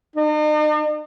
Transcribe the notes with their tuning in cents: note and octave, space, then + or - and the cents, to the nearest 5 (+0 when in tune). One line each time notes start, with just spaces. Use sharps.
D#4 -45